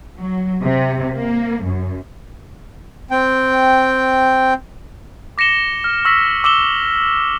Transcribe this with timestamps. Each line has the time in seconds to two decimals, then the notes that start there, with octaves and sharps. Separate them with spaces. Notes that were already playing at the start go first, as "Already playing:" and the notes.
0.19 F#3
0.62 C3
1.13 A#3
1.64 F#2
3.11 C4 G5
5.38 D6 A#6 C#7 E7 G7
5.84 F6
6.05 C#6 E6 A#6 B6
6.44 D6 E6 E7 G7